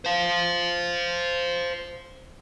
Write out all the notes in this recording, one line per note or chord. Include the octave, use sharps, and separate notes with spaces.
C5 F5